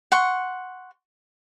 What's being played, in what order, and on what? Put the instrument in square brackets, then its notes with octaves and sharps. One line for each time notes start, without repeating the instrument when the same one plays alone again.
[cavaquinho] F#5 C6 C#6